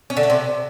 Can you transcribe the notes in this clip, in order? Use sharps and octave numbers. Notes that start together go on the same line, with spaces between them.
C#4
D3
A3
C3